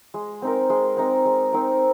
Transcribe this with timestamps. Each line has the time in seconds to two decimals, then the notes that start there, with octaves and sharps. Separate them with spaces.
0.14 G#3
0.42 C4 D#4 A#4
0.70 G#3
0.97 C4 D#4 A#4
1.25 G#3
1.53 C4 D#4 A#4